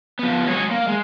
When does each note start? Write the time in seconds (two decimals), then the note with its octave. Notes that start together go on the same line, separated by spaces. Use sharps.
0.19 F3 B3
0.47 F#3 G#3 G#4 C#5
0.71 A#3
0.88 G#3